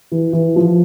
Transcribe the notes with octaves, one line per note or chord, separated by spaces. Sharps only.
E3
E3
F3